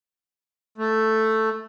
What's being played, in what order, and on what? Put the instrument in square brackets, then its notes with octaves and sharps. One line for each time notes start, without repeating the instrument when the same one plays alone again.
[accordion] A3